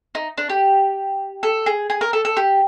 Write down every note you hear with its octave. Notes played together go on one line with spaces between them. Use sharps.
D#4
D4
G4
A4
G#4
G#4
A#4
A4
A4
G4